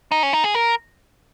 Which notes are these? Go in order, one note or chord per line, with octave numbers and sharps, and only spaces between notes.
D#4
C#4
D#4
G#4
A#4